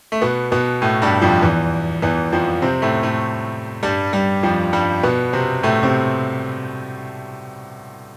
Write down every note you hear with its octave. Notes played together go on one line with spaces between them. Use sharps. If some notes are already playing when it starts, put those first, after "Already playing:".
A3
B2 B3
B2 B3
A2 A3
G2 G3
F2 F3
E2 E3
E2 E3
F2 F3
C3 C4
A2 A3
A2 A3
G2 G3
G2 G3
F2 F3
G2 G3
B2 B3
C3 C4
A2 A3
C3 C4